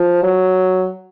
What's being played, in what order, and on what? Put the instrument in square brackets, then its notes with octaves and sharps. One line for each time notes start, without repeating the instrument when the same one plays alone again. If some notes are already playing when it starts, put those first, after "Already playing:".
Already playing: [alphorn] F3
F#3